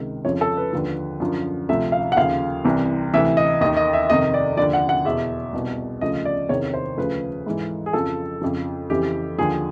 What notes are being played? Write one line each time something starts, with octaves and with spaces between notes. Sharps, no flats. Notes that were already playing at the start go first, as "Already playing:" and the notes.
Already playing: C#2 C3 D#3
F2 C#3 F3 C#5
A4
B4
D#2 D3 F3
F#2 D3 F3
D2 C3 F3 E5
F5
F#5
D#2 C#3 F3 F5
C2 C3 E3
D2 C3 E3 E5
D#5
D#2 D#3 D#5
D#5
E5
F2 C3 D#3 D#5
D5
D#2 D3 F3 D5
F#5
F#5
E2 B2 E5
C2 B2
D2 C#3 F3 D#5
D5
E2 C3 D#3 C#5
C5
D2 C#3 F3 B4
G#2 E3
G#4
F2 C#3 F3 A4
F2 C#3 F3
F2 C#3 E3 G4
D#2 D3 F3 G#4